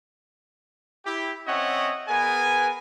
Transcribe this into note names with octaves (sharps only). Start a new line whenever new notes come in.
E4 G4
C4 C#4 C#5 D#5 E5 F#5
B3 G#4 A#4 B4 G#5